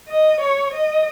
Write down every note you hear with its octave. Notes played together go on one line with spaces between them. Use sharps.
D#5
C#5
D#5